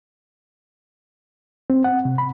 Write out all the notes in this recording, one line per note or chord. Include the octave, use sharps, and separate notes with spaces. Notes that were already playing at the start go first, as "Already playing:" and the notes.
C4
F#5
C3
B5